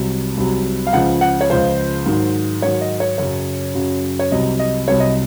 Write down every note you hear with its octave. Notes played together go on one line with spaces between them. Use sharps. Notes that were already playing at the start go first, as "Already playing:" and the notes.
Already playing: C2 C3 F#3
C2 C3 F#3
F5
C#2 C#3 F3 F#5
F#5
C#5
C#2 C#3 F3 C5
G#2 D#3 F#3
G#2 D#3 F#3 C#5
D#5
C#5
F#2 C#3 F#3 C#5
F#2 C#3 F#3
C#5
C2 C3 F#3 D#5
D#5
C2 C3 F#3 C#5
D#5